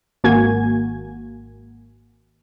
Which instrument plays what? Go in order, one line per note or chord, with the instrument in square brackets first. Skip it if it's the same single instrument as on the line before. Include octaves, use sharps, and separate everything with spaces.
[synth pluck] G#1 A#3 F#4 G#5 G#6